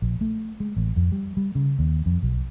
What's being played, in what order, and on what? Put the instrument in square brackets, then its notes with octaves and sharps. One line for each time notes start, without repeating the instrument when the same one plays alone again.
[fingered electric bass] A#1
A3
G#3
A1
F2
G3
G3
C#3
D#2
F2
B1